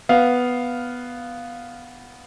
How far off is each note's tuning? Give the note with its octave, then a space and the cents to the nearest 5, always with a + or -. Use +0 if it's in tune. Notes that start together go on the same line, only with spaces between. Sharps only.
B3 +0 F5 +0